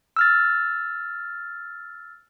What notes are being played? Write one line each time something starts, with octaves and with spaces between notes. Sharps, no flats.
E6 F6 A6